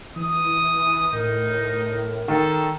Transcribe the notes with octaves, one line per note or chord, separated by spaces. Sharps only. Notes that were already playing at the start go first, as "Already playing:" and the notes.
E3 D#6
A2 D#4 A#4
D#3 A4